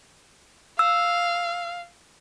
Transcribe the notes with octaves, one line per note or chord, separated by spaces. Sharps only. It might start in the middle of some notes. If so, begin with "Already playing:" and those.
F5 E6